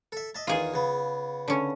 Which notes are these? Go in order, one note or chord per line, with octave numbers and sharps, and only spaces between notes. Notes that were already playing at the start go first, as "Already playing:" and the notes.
A4 E5
D#5 E5 A5
E2 D#3 F4 G#4 D#6
C#3 B3
D3 C#4